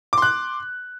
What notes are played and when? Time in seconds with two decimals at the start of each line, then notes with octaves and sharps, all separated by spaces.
0.13 D6
0.18 C6
0.22 F#6